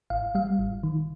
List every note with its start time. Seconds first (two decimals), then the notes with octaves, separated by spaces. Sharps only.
0.10 G#1 F5
0.35 G3 F5
0.59 G#1
0.83 D#3